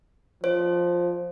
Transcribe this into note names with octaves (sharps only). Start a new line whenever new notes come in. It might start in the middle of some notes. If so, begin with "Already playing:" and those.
F3 C5